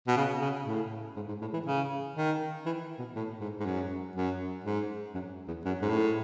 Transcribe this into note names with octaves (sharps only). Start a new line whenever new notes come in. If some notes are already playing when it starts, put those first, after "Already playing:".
B2
C#3
C#3
A2
G#2
G#2
A2
E3
C#3
D#3
E3
B2
A2
G#2
G#2
F#2
F#2
G#2
F#2
E2
F#2
G#2
A2